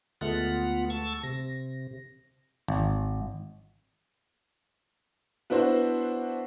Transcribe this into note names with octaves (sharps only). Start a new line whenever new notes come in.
D2 G#3 A3 B3 F4 F#5
A5 C#6 E6
C3 A#6
G#1
B3 D4 E4 F#4 C5